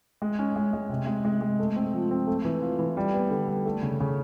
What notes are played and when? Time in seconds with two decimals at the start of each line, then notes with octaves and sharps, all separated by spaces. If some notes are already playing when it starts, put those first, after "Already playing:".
0.22 G#3
0.39 C#4
0.56 G#3
0.73 G#3
0.89 C3
1.07 G#3
1.25 G#3
1.41 G#3
1.59 A3
1.76 C4
1.94 F3
2.11 C4
2.27 A3
2.45 E3
2.61 F4
2.79 E3
2.97 G3
3.14 B3
3.30 D3
3.48 G3
3.65 A3
3.83 C#3
4.00 C#3